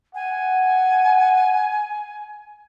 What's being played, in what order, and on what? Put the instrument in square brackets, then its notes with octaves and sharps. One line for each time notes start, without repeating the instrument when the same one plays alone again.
[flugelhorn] F#5 [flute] G#5